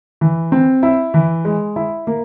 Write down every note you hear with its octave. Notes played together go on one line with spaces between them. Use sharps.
E3
C4
E4
E3
G#3
E4
A#3